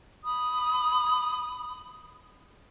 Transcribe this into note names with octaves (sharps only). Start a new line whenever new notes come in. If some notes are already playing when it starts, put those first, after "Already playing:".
B5 D#6